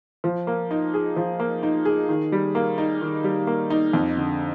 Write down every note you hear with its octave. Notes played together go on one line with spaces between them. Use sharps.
F3
A#3
D#4
G#4
F3
A#3
D#4
G#4
D#3
G3
A#3
D#4
D#3
G3
A#3
D#4
F2
D3